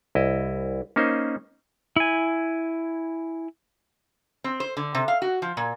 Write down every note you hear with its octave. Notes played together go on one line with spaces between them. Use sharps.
C2 E4 D#5
A#3 C#4 D#4 C5
E4 G#5
C4
C5
D3
C3
F5
F#4
F3
A#2